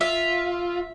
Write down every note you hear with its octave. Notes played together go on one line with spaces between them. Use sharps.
F4 E5